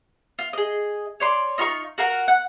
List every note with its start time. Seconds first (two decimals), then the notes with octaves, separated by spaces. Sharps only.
0.39 F4
0.53 G#4 D#5
1.20 C#5 D5 C6
1.58 D#4 F4 C6 C#6
1.98 F#4 A#4 F5 F#5
2.28 F#5